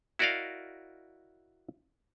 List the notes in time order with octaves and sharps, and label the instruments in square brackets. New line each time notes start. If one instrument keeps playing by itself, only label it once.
[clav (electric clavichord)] E4 F#4 A#4 D5 D#5 F5